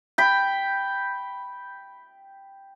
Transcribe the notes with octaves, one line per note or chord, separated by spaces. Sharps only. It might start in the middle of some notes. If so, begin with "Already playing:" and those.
G5 B5